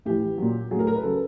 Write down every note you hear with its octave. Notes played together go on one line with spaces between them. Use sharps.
A2 E3 G4
A#2 F#3
A2 F#3 G#4 A#4
A#4
B4
C#3 F#3 A4